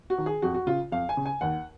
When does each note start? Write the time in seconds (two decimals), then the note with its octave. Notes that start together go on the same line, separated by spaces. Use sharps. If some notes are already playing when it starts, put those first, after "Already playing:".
0.10 F#4
0.18 D#3
0.26 G#4
0.42 F2 F#4
0.54 F#4
0.67 C#3 F4
0.92 F2 F5
1.09 G#5
1.17 C#3
1.26 G#5
1.41 D#2 F#5